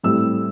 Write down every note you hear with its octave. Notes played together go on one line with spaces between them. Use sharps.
A2 G3 C4 E6